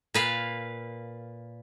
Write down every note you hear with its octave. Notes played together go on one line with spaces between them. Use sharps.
A#2 B4 F5